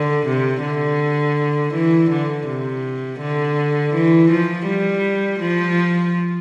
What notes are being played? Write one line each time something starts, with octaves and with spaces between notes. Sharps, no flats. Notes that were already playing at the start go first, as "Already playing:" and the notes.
Already playing: D3
C3
D3
E3
D3
C3
D3
E3
F3
G3
F3